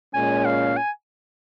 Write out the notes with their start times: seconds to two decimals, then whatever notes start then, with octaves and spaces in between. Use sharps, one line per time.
0.14 A#2 G#3 C#4 G#5
0.45 F5
0.77 G#5